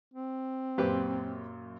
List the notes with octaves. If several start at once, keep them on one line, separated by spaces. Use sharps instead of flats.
C4
F#2 A#2 G4 B4 C5